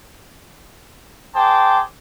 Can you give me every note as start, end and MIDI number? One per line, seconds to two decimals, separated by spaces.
1.36 1.80 68
1.36 1.80 72
1.36 1.80 79
1.36 1.80 81
1.36 1.80 86